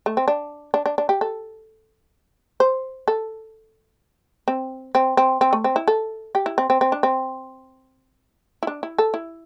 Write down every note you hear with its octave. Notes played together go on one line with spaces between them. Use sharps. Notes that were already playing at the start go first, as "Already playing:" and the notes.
A3
C4
D4
D4
D4
D4
G4
A4
C5
A4
C4
C4
C4
C4
A3
C4
E4
A4
G4
E4
C4
C4
C4
D4
C4
E4
D4
E4
A4
E4